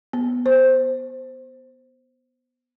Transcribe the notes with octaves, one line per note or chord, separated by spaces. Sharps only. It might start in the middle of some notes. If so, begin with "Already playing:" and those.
B3
C5